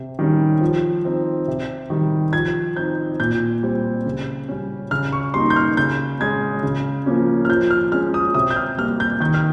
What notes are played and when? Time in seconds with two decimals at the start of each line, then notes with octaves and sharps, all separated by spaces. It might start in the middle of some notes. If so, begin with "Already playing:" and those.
Already playing: C3
0.19 D#3 G3 C#4
0.61 F3
1.05 C4 D#4
1.48 C3
1.90 D#3 G3
2.33 F3 G#6
2.76 C4 D#4 G6
3.20 A#2 G6
3.63 G3 C4
4.06 C#3
4.48 G3 C#4
4.91 C#3 F6
5.13 C#6
5.34 G3 A#3 D#4 C6
5.50 G6
5.56 F6
5.77 C#3 G6
6.20 G#3 C#4 G#6
6.63 C#3
7.06 F3 A#3 C#4
7.45 F6
7.48 F3 G6
7.71 F6
7.92 G#3 C#4 F6
8.14 D#6
8.34 C3 D#6
8.50 G6
8.56 F6
8.77 G3 A#3 F6
9.00 G6
9.20 D#3 G6
9.34 F6